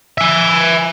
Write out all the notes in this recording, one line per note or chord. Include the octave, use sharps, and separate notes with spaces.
E5 G#5